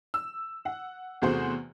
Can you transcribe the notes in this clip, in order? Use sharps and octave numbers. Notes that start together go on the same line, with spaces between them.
E6
F#5
E2 C3 A3 F#4 G#4 C5